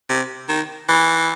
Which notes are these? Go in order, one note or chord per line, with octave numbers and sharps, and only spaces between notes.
C3
D#3
E3